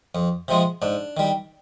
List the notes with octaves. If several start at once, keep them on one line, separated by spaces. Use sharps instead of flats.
F2
C3 F3 G#3
G#2 D4
D#3 G3